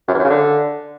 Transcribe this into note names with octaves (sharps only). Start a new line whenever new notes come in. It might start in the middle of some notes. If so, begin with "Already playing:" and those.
F#2
E2
F#2
C#3
D3